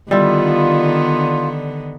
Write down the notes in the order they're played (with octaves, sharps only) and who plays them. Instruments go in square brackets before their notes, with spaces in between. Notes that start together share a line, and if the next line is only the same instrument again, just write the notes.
[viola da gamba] D3 D#3 B3 [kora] G3 E4 [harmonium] F4